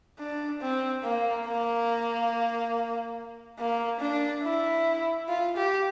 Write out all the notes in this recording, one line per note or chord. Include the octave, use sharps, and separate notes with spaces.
D4
C4
A#3
A#3
A#3
D4
E4
F4
G4